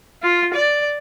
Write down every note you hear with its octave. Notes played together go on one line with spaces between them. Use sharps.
F4
D5